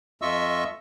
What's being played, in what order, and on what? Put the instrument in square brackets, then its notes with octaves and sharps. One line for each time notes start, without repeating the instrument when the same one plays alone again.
[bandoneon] F2 F4 D#5 E5 C#6 E6